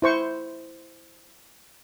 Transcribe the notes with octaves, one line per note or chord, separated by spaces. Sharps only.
E4 C5 C#6